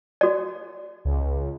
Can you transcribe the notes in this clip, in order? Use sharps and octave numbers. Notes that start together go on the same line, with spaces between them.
F#4 D5
C#2